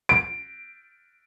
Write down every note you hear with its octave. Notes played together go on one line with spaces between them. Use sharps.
D7